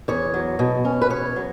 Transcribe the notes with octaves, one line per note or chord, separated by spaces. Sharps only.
E2 C#5
F#3
B2
C#4
B4
E2 C#5
F#3